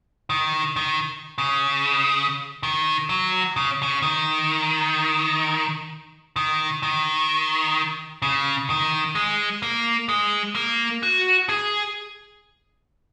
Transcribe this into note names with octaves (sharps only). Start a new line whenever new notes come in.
D#3
D#3
C#3
D#3
F#3
C#3
C#3
D#3
D#3
D#3
C#3
D#3
G#3
A#3
G#3
A#3
F#4
G#4